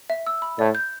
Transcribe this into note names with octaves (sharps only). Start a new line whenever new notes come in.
E5
E6
B5
A2 D5
G6